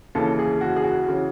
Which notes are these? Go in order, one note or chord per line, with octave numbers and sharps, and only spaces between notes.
D#2 C#3 E3 A4
G#4
F#4
G#4
F#4
C#3 E3